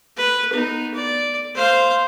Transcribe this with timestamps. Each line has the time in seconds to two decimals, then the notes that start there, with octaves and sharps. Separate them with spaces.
0.17 B4
0.52 B3 D#4
0.95 D5
1.56 C5 F5